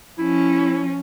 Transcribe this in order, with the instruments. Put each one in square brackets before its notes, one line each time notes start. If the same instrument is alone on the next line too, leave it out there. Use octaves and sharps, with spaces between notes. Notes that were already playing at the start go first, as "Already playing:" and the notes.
[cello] F3 C#4 [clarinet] E4